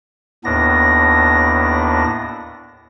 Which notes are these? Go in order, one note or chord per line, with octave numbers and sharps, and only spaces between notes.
D#2 A2 B3 D4 A#6